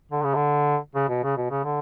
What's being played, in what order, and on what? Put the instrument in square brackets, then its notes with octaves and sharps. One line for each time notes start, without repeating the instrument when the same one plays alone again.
[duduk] D3
C#3
D3
C#3
B2
C#3
B2
C#3
D3